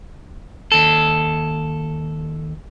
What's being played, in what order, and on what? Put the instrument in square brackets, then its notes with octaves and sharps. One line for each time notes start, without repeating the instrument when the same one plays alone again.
[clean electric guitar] D#2 A4